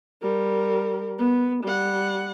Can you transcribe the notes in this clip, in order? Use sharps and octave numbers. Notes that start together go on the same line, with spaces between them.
G3 A#4
B3
G3 F#5